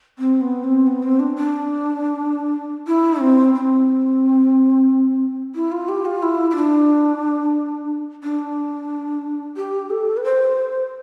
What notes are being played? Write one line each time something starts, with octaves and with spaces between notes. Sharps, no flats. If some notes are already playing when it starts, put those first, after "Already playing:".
C4
B3
C4
B3
C4
D4
D4
E4
C4
C4
E4
F4
G4
F4
E4
E4
D4
D4
G4
A4
B4
C5